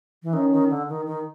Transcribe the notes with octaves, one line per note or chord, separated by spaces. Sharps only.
E3
D#3 C#4
D#3
D3
D#3
D#3